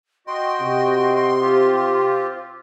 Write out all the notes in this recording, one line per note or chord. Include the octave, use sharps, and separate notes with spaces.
F#4 D#5 G5 C6
C3
C4 F4 G4